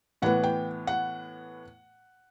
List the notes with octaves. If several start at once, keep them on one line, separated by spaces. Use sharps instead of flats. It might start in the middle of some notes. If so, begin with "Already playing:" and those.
A2 E3 B3 F#5
G5
F#5